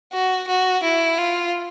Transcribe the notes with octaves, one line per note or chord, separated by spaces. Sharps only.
F#4
F#4
E4
F4